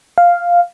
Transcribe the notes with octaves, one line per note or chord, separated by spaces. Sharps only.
F5